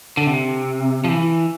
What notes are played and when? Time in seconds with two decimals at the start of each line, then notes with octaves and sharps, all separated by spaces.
0.17 D3
0.27 C3
1.04 F3
1.08 E3